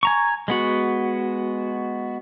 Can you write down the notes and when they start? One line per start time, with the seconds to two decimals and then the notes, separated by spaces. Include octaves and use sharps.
0.03 G#5 A#5 C#6
0.48 G#3 B3 F#4